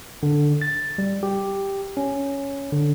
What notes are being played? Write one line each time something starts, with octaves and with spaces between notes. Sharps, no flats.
D3
A6
G3
G4
C#4
D3